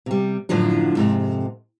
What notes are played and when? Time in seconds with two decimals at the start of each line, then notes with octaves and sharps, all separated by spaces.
0.06 C3 G3
0.49 F#2 A2 D3 F3 F#3 D4
0.95 F2 G#2 C3